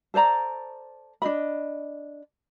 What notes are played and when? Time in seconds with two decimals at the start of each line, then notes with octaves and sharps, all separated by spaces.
0.14 A4 C5 D5 A#5
1.22 D4 F#4 D#5 B5